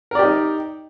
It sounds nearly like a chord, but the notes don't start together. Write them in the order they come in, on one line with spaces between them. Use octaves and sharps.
A#4 D5 G4 D#4